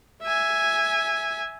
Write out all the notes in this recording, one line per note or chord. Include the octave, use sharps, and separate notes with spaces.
E5 G#5